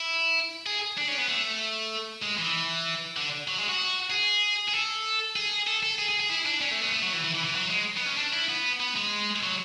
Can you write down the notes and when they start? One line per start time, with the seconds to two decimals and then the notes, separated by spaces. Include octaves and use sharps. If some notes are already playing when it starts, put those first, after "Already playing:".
Already playing: E4
0.67 G#4
0.98 D4
1.08 C#4
1.18 B3
1.29 A3
2.23 G#3
2.39 E3
3.17 D3
3.48 F#3
3.58 G#3
3.69 F#4
4.10 G#4
4.68 G#4
4.73 A4
5.36 G#4
5.67 A4
5.83 A4
5.98 G#4
6.09 G#4
6.20 G#4
6.30 E4
6.46 D4
6.61 C#4
6.71 A3
6.81 B3
6.93 A3
7.03 F#3
7.13 E3
7.24 E3
7.34 E3
7.45 E3
7.55 F#3
7.70 G#3
7.97 B3
8.07 C#4
8.18 D4
8.33 E4
8.49 B3
8.80 B3
8.96 G#3
9.43 F#3